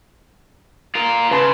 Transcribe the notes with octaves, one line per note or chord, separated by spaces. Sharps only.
F4 A#4
C#3 B4 A5 C6